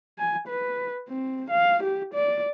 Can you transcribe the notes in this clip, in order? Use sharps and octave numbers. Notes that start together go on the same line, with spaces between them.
G#5
B4
C4
F5
G4
D5